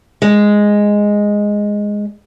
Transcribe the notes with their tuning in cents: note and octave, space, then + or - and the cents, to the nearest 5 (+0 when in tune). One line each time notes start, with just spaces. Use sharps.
G#3 -5